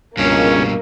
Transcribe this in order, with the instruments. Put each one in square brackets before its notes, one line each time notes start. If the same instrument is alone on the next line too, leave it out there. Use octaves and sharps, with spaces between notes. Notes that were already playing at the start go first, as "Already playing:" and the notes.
[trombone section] C#2 [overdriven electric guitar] G2 B2 [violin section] A#3 [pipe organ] C#4